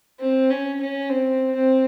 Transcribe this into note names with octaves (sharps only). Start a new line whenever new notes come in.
C4
C#4
C#4
C4
C4